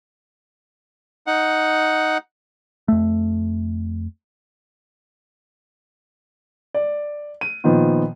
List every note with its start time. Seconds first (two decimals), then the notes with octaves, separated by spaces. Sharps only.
1.27 D#4 F#5
2.88 F2 A3
6.74 D5
7.41 D#7
7.64 A#2 D#3 F3 B3